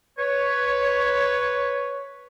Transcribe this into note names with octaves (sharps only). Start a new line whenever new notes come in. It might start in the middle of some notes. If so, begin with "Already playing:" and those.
B4 C#5